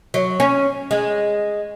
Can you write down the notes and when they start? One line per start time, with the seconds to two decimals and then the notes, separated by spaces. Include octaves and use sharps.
0.14 F#3
0.40 C#4
0.91 G#3